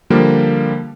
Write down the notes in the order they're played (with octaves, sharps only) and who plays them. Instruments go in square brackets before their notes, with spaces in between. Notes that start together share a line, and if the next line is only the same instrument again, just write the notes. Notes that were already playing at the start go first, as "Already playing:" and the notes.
[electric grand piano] D3 F3 G3 A#3